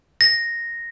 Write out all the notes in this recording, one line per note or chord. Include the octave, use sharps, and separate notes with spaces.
A#6